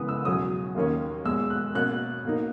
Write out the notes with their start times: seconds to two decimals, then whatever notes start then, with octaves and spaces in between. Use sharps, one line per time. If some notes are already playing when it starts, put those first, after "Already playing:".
Already playing: C#3 E3 G#3 B3 D#6
0.08 E6
0.25 E2 B2 F#3 C#4 D#6
0.75 D#2 D#3 A#3 C#4
1.25 E2 B2 G#3 E6
1.50 F#6
1.75 B2 A#3 C#4 F#6
2.25 B2 A#3 D#4